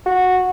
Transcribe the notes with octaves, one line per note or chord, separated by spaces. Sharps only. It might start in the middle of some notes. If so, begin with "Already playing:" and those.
F#4